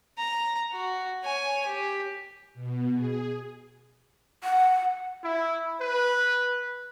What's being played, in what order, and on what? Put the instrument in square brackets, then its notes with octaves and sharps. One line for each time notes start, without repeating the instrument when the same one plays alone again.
[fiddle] A#5
F#4
C#5 G#5
G4
[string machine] B2
G#4
[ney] F#5
[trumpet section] E4
B4